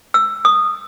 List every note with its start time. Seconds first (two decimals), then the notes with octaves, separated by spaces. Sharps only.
0.14 E6
0.45 D#6